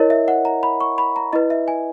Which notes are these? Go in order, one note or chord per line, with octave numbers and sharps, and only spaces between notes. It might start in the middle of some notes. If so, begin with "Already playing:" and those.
Already playing: E4 A#4 C#5 D#5
E5
F#5
A#5
B5
C#6
B5
A#5
E4 B4 D#5
E5
G#5